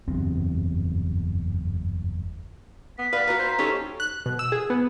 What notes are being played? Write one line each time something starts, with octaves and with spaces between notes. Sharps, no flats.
F#1 E2 G2 C4
B3 B6
B4 D5 F5
F#4 B4 A#5
C5
C#4 D#4 G4 A4 C#6
F#6
B2
E6
G#4
B3